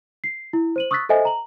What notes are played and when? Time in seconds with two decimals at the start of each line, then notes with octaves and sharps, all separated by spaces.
0.24 C7
0.53 E4
0.76 C5 D#7 F#7
0.91 C#6 D#6 E6 F#6 A6 B6
1.09 A4 C5 D#5 E5 G#5
1.25 A#5 F#7